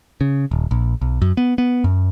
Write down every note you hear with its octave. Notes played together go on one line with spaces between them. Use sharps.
C#3
D#1
A#1
B1
F#2
B3
B3
F#2